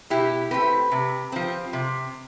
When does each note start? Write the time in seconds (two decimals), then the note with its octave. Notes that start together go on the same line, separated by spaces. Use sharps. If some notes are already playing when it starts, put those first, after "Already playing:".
0.10 B2 E4 G4
0.51 A3 C4 G4 B4
0.92 C3
1.32 F3 C4
1.73 C3